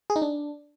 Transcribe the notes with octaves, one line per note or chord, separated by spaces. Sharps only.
G#4
D#4
D4